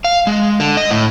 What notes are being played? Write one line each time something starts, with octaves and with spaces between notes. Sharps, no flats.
F5
G#3
D3
D#5
A2